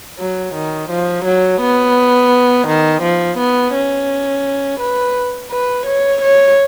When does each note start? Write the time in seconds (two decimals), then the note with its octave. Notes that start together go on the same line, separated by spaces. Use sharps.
0.19 F#3
0.54 D#3
0.90 F3
1.25 F#3
1.61 B3
2.67 D#3
3.02 F3
3.38 B3
3.74 C#4
4.80 B4
5.51 B4
5.86 C#5
6.22 C#5